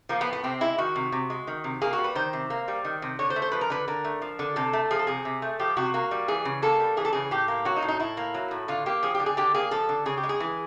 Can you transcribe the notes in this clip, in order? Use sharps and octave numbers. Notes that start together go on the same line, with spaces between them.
F3 A#3
B3
A2
B3
C3 C4
G#3 E4
D#3 F#4
C3
C3
G#3
D#3
C3
A#3 G#4
F#4
G3
B4
D#3 C5
C3
A#3
G3
D#3
C3
D3 C#5
C5
A3
C5
F3 B4
A#4
D3 B4
D3 A#4
A3
F3
D3
C3 A4
A3
F3 G#4
A4
C3 G#4
C3
A3
F3 G4
C3 F#4
A#3 F#4
G3
E3 G#4
C#3
A#3 A4
G3
E3 G#4
A4
C#3 G#4
A2 G4
A#3
F#3 F#4
D#4
A2
D#4
A2 E4
A#3
F#3
A2
D3 F4
A#3 G4
F3 G#4
G4
D3
G#4
D3 G4
A#3 G#4
F3 A4
D3
C#3 G#4
G4
G#3
G#4
E3